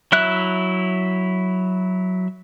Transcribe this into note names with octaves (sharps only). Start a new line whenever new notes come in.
F#3 E4 E5 F#6